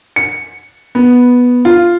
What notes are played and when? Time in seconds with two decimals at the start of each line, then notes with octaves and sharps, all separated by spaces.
0.16 C#7
0.95 B3
1.65 F4